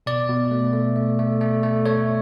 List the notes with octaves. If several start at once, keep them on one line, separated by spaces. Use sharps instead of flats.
B2 D5
B2
A3
A3
A3
A3
A3
A3
A3 C#5